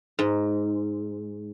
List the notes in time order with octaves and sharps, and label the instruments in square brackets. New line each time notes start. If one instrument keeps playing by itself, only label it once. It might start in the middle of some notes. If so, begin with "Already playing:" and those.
[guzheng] G#2